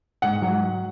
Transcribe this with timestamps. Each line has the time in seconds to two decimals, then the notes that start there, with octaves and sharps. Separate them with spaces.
0.22 G#2 F#5
0.42 F#3